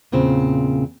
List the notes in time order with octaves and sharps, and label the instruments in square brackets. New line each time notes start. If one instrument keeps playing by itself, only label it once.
[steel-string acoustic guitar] E2 A#2 C#3 C4